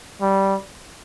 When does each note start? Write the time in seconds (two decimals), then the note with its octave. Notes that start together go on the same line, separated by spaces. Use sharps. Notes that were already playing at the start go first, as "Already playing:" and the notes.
0.21 G3